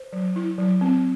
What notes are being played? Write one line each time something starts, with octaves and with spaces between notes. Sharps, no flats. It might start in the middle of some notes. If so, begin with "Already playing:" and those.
Already playing: C5
F#3
E4
F#3
C4